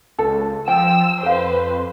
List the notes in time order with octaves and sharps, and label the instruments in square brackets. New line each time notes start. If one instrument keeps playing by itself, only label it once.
[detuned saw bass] C#2 [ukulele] A4
[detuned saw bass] F3 [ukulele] G5 [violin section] E6
[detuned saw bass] F2 [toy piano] A4 F5 [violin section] B4 C5